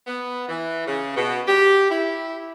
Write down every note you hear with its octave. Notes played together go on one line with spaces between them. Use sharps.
B3
E3
C#3
B2
G4
E4